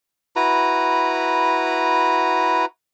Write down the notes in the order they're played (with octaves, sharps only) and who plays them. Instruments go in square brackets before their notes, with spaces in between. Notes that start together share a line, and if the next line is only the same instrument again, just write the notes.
[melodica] E4 F#4 B4 A#5